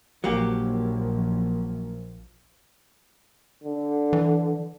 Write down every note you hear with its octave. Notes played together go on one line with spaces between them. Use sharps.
A#1 F#3 A#3 G4
D3
E3